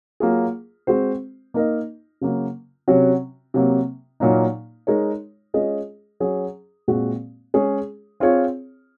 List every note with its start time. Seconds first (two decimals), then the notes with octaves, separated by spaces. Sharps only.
0.20 F#3 A#3 F4 G#4
0.87 G#3 C4 F#4 C5
1.54 A#3 D#4 A#4 D#5
2.21 C#3 F#3 A#3
2.88 C3 F#3 C#4 F#4
3.54 C3 F#3 A#3
4.20 A#2 F#3 A#3 D#4
4.87 G#3 D#4 A#4 C#5
5.54 G#3 C#4 F4 G#4 D#5
6.20 F#3 C#4 G#4
6.88 A#2 G#3 C4 F#4
7.54 G#3 C#4 G#4 C#5
8.20 C4 F4 G#4 C#5